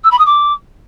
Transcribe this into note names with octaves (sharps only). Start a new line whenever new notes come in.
E6
B5
D#6
D6